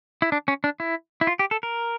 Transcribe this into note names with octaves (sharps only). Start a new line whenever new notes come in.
E4
D4
C#4
D4
E4
E4
F4
G4
A4
A#4